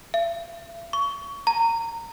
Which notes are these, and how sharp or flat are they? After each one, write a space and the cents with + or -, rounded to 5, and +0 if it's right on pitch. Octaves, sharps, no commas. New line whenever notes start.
E5 +45
C#6 +20
A#5 -25